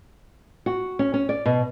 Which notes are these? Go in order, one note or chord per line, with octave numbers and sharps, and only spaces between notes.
F#4
C#4
C#4
D5
B2